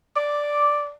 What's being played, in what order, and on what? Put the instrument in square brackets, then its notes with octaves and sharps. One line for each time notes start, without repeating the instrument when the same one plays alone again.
[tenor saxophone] D5 [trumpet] D6